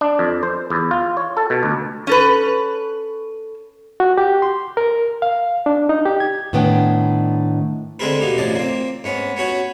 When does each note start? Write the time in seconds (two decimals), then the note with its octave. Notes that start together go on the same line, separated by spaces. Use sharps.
0.01 D4
0.19 F2
0.43 C5
0.70 E2
0.91 F4
1.17 C#5
1.37 A4
1.50 B2
1.63 D2
2.07 C#4 A4 B4
4.00 F#4
4.18 G4
4.42 C6
4.77 A#4
5.22 F5
5.66 D4
5.89 D#4
6.06 G4
6.20 G#6
6.53 A2 D#3 B3 D4 G5
7.99 D3 G#3 C4 G#4 A#4 B4
8.20 B2 A#3 D#4 G4
8.38 A1 C#3 F3 D5 D#5
8.55 A#3 C4
9.04 G#2 B3 C#4
9.37 B3 C#4 F#4 C#5